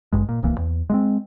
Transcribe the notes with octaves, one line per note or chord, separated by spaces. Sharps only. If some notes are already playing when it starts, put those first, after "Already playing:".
G#1 G2 G#3
A#2
D1 C2 E3 A#3
E2
G#3 A#3 C4